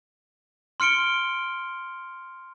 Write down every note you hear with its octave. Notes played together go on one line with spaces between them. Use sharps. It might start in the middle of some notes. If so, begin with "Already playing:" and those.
C6 F6 C#7 D7 G7